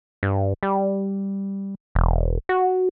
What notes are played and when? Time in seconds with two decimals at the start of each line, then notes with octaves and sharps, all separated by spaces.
0.23 G2
0.63 G3
1.95 E1
2.49 F#4